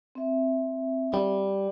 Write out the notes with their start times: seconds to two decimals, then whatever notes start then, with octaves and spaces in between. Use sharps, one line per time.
0.15 C4 E5
1.14 G3